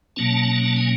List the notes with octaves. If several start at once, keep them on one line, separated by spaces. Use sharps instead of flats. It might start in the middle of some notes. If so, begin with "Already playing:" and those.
B2 F#3 A#3 C#4 A5
A5
G#5